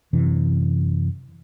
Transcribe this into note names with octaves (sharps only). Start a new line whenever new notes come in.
F#2 C3 E3